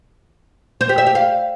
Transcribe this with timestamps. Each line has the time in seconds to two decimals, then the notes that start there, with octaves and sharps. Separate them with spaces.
0.81 C5
0.89 G4
0.98 E5
1.06 G4
1.15 F5